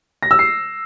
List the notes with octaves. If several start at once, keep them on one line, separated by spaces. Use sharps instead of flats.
A#6
E6
C7